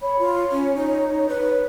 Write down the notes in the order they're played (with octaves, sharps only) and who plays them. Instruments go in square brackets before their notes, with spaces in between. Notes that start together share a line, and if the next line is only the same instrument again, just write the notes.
[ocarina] C#5 [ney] B5
[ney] F4
C#4
D#4
B4